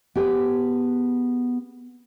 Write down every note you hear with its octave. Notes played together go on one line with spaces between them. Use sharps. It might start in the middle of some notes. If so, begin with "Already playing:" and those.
B3 G4 G#4 B4